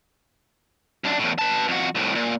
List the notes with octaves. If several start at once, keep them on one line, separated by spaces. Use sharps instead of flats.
F#2 D4
E2 A2
B4 A5
F2 F#4
C2 A2
A#2